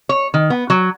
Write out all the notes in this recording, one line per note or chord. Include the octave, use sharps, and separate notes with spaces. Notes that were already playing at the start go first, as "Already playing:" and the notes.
C#5
D#3
B3
F#3